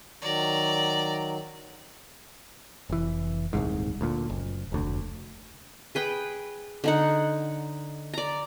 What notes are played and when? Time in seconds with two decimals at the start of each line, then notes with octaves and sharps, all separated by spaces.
0.22 D#3 F#3 D5 A#5
2.90 F1 E3
3.53 D#1 C2 G#2
4.01 D2 A#2
4.30 F#1
4.72 F1 D2
5.95 G#4 B4 G5
6.84 D3 D#4 F#5
8.14 D5 A#5